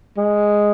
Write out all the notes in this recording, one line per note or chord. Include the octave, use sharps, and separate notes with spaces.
G#3